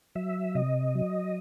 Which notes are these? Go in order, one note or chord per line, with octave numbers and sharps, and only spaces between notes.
F#3 E5
C3 D#5
F#3